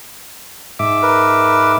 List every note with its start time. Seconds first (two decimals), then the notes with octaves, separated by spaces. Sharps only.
0.79 G#2 E5 D6
1.02 A#4 B4